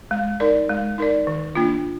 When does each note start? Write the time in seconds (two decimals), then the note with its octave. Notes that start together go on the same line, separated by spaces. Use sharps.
0.11 G#3
0.40 D#4 A#4 D5
0.69 G#3
0.98 D#4 A#4 D5
1.27 D#3
1.55 A#3 D4 F4